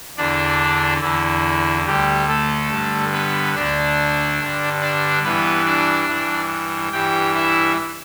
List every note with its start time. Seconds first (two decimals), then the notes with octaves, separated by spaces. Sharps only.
0.17 E2 D3 D4 D5
1.01 E2 D3 E4
1.85 D2 D3 G3 G4
2.28 A3 A4
2.70 G2 D3
3.12 B3 B4
3.55 D2 D3 D4 D5
4.39 G2 D3
4.81 D4 D5
5.23 G2 E3 B3 B4
5.66 D4 D5
6.08 G2 E3
6.92 G2 E3 G4 G5
7.34 E4 E5